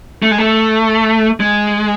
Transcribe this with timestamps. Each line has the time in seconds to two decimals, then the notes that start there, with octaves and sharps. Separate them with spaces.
0.22 A3
0.31 G#3
0.38 A3
1.40 G#3